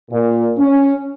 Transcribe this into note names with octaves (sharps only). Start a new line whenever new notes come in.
A#2
C#4